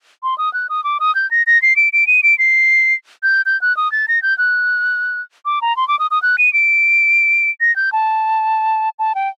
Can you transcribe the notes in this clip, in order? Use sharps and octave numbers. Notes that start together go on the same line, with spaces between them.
C6
D#6
F#6
D#6
D6
D#6
G6
A#6
A#6
C7
D7
D7
D#7
D7
C7
G6
G6
F#6
D#6
A6
A#6
G6
F#6
D6
A#5
C6
D6
D#6
D#6
F#6
D#7
D7
A#6
G6
A5
A5
G5